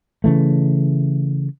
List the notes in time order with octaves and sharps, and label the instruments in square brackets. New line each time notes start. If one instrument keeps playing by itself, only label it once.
[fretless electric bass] C#3 E3 A3